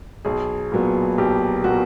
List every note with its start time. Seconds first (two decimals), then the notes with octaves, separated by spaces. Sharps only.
0.25 B1 G#4
0.72 A#2 F#3 B3
1.18 B1 G4
1.64 A#2 F#3 B3 F#4